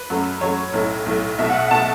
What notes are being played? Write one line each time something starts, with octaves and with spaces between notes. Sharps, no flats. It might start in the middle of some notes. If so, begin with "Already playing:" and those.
Already playing: B4
F#2 F#3 A3
F#2 F#3 A3 C#5
B1 A2 A3
B1 A2 A3
B1 B2 A3 E5
F#5
B2 A3 A5